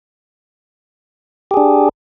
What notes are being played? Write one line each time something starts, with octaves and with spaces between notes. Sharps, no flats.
D4 G4 G#4